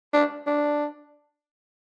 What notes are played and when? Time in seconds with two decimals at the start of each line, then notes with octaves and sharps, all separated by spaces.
0.13 D4
0.46 D4